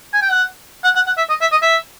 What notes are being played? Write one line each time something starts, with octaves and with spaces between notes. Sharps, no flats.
G#5
G5
F#5
F#5
F#5
F#5
E5
D#5
E5
D#5
E5